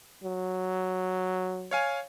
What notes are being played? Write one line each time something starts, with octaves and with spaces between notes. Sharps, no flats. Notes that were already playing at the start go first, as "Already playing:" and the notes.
F#3
C#5 F5 G#5